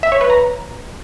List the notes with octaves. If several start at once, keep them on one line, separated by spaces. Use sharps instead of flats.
E5
C#5
B4
A#5